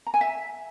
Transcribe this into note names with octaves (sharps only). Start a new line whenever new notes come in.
A#5
G#5
E5